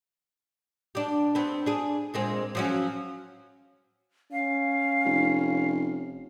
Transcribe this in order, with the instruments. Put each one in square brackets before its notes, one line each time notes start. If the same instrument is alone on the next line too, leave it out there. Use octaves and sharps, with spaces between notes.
[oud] D4 G4
B3 C4
D4 G#4
A#2 G#3 C4
F3 F#3 C#4
[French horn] C#4 [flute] F5
[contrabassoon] F1